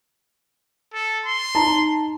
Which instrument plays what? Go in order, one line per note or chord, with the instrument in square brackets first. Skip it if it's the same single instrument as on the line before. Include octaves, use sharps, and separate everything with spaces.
[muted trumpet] A4
C6
[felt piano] D#4 A5 A#5